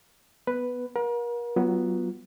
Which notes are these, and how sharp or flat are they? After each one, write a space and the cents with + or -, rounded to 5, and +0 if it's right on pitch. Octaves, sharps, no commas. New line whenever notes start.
B3 +0 B4 +0
A#4 +40 F#5 -45
F#3 +20 B3 -5 F4 +0